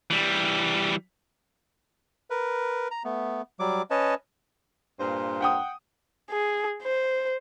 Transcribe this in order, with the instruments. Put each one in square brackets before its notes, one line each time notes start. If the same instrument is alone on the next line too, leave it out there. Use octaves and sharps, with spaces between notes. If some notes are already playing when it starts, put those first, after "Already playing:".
[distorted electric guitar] E3 G3
[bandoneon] A#4 B4
A#5
A3 B3
F#3 G3 D6
C#4 B4 C#5 D#5 A5
[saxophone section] G2 A#2 C5
[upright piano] F#5 G5 D#6
[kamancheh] G#4
C5